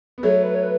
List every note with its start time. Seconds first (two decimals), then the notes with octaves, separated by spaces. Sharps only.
0.18 B3
0.23 F#3 A3 C#5
0.43 B4
0.55 C#5
0.63 B4